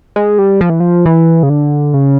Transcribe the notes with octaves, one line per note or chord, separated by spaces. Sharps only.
G#3
G3
F3
E3
F3
E3
C#3
D3
C#3